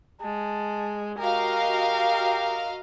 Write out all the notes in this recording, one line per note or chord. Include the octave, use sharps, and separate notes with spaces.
G#3 A5
F#4 G4 A#4 D#5 F5